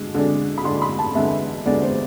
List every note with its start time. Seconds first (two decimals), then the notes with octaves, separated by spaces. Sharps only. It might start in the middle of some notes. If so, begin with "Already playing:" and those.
Already playing: D3 G#3 D4
0.14 D3 G#3 D4
0.58 B5
0.64 D3 G#3 D4 C6
0.82 B5
0.99 A5
1.15 E2 D3 G#3 B3 E5
1.66 E2 D3 G#3 B3 D5
1.82 C5